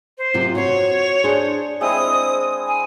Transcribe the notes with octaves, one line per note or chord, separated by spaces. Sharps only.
C5
F#2 C3 F4
F#4 C5 C#5
D4 G#4 C5
G#3 C4 E4 D#6
G#5